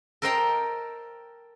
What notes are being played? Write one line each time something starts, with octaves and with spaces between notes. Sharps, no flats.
A4 A#4 C5 D#5 G5 A#5